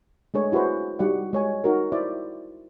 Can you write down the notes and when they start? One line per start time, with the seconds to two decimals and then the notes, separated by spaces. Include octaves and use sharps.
0.34 G#3 A3 D4 G#4 B4 C#5
0.52 E4 F#4 G#4 B4 C5
0.99 G3 D#4 F#4 D5 F#5
1.33 G#3 C#5 G#5
1.64 D#4 F#4 A#4
1.92 E4 C5 D5 E5